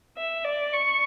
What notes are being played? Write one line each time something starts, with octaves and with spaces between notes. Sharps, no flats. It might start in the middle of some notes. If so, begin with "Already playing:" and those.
E5
D5
C#6